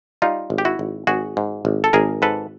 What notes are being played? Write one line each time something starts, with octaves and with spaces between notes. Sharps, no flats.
G3 D#4 F4
G#1
G4
E4 F#4
G#1
G#1 F#4 G#4
G#2
G#1
A4
G#1 G#4 A#4
G#2 A4 B4